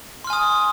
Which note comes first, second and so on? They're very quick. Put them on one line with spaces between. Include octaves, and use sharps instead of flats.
C6 F6 G#5 D#6